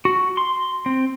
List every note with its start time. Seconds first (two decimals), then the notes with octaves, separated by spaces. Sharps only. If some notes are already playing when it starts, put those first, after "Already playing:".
0.05 F#4
0.37 C6
0.86 C4